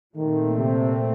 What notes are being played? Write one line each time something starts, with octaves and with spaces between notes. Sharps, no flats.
A#2 D#3 A3 C4
C3